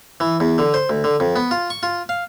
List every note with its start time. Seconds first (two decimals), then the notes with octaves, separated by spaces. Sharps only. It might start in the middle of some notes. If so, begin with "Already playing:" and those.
0.20 E3
0.40 E2
0.58 D3
0.74 C5
0.90 D2
1.04 D3
1.20 F2
1.36 B3
1.51 F4
1.70 C#6
1.83 F4
2.09 F5